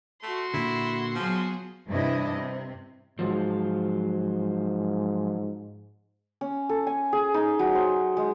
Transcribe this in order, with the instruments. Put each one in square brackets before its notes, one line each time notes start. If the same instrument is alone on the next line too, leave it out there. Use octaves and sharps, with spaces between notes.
[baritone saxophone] A3 [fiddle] F#4 C6
[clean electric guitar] A#2 D3 [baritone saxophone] E4
[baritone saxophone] F3 [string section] F#3 B3 G#4
[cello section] G2 C3 E3 D4 E4 D#5
C3
[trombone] G#2 [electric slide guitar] F3 F#3 F4
[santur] C#4
A4
G#5
G#4
D#4
F#3
C5
G#3